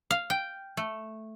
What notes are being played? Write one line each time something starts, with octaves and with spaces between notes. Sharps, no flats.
F5
G5
A3